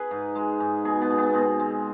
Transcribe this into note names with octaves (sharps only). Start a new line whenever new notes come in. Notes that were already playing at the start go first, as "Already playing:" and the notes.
Already playing: G#4 B4
G#2
G#3
G#2
B2 G#4
B3
B2
B3
B2 C4
G#3